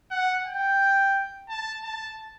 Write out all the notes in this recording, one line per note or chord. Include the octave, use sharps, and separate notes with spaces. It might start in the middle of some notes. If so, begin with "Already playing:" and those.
F#5
G5
A5
A5